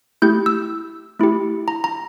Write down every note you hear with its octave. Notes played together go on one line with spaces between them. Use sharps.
A3 E4 G4 G6
E6
A3 E4 G4
A#5
A#5